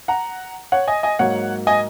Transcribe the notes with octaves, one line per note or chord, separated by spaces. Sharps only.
F#5 A#5
C#5 F#5
D#5 G#5
D#5 G#5
G#2 F#3 A#3 C#5 F#5
D#5 G#5